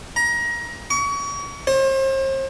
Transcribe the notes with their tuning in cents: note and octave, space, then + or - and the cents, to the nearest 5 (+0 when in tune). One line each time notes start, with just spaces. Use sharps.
A#5 +25
C#6 +35
C5 +40